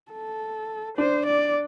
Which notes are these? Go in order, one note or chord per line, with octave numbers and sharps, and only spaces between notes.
A4
D4 C5
D5